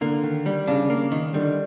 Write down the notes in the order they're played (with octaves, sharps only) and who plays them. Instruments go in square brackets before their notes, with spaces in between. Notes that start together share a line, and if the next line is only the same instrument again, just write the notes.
[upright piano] D3 [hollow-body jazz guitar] A#3
[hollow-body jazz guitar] D#3
G3
[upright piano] C#3 [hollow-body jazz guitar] D4
[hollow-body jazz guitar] A#3
D#3
[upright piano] D3 [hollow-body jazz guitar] G3